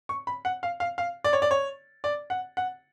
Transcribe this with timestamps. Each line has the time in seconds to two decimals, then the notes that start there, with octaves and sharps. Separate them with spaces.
0.09 C#6
0.27 B5
0.45 F#5
0.63 F5
0.80 F5
0.98 F5
1.24 D5
1.33 C#5
1.42 D5
1.51 C#5
2.04 D5
2.30 F#5
2.57 F#5